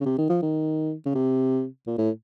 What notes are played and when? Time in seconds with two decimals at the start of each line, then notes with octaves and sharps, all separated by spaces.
0.01 C#3
0.06 C3
0.18 D#3
0.30 F3
0.42 D#3
1.06 C#3
1.15 C3
1.87 A#2
1.98 A2